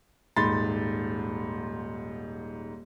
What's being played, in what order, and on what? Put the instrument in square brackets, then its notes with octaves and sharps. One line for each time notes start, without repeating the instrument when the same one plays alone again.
[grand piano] D#1 G#2 B5 C6 A6